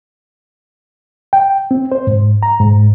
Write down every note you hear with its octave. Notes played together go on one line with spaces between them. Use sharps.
G5
C4
C5
G#2
A#5
G#2